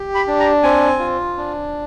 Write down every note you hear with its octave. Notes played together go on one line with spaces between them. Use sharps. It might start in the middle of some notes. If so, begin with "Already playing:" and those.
Already playing: G4
B5
D4
A#5
C4 G#5
F4
D4